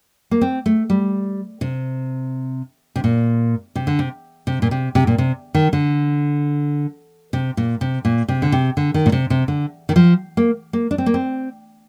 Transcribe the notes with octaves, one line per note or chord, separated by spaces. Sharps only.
A#3
C4
A3
G3
C3
C3
A#2
C3
D3
C3
C3
A#2
C3
C3
A#2
C3
D#3
D3
C3
A#2
C3
A#2
C3
D3
C3
D3
D#3
A#2
C3
C3
D3
D#3
F3
A#3
A#3
D4
C4
A#3
C4